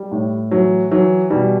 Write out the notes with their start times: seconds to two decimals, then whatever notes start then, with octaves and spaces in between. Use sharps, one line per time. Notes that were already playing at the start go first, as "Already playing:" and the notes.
Already playing: G3
0.12 A2
0.51 E3 F#3
0.91 E3 F#3
1.30 B2 G3